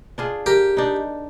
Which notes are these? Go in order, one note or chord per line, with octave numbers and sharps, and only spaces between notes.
D4 F4 G#4
G4 A#4
D4 D#4